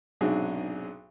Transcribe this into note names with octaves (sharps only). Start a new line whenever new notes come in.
B1 G#2 C3 F#3 D4 G#4